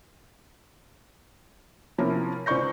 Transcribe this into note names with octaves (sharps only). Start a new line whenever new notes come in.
C3 F3 C#4 E4 A#4
C#2 C5 D5 C#6 G6 A#6